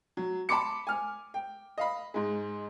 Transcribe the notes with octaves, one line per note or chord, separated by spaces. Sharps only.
F#3
A5 B5 C6 D6 C#7
G#5 F6
G5
D#5 F5 B5
G#2 G#3